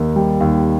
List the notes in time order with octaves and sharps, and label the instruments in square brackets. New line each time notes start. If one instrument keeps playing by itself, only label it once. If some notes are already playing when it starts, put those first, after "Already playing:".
Already playing: [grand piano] D#2 D#3
G3
D#2